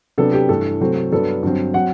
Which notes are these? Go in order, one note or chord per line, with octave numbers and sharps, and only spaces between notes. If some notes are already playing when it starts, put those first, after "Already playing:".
C3 F#3 B3 D4 A4
G4
G2 E3 A3 A4
C3 F#3 A3 C4
G2 F#3 B3 D4 A4
G2 D3 F#3 C4
F#3 C4 F#5